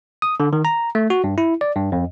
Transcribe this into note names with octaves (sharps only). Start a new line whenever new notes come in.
D#6
D3
D#3
A#5
A3
F#4
G2
E4
D5
G2
F2